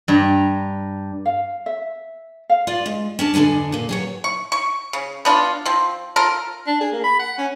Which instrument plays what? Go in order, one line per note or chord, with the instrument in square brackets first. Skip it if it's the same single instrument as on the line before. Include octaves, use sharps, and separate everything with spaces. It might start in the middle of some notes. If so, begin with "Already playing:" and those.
[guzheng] G2 A#5
[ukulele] F5
E5
F5
[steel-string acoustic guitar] F4 D5
G#3
C#4 D4 A5
F2 D3 D4 E4 G#5
A#2 A#3
F#3 G#4 C#5
[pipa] C#6
C#6
C#3
B3 D4 F4
F3 C4
F4 A4 A#4
[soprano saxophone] D4
G#4
A#3
B5
F#5
C#4